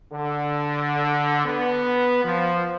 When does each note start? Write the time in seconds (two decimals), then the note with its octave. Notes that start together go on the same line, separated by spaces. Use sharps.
0.13 D3
1.45 B3
2.24 F3